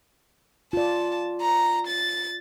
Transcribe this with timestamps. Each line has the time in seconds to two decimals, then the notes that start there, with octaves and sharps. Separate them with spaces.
0.73 F4 D5 A5
1.41 A#5
1.87 A6